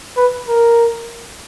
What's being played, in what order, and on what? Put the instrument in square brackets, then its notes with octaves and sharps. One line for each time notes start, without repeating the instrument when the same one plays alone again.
[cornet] B4
A#4